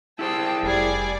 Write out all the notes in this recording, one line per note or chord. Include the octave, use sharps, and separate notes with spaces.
E4 G4 G#4 C5 G5 A5
F1 G3 G#4 D5 G#5